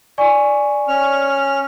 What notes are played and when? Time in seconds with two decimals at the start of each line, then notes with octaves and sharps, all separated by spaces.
0.18 D5 G#5 C#6
0.88 C#4 F6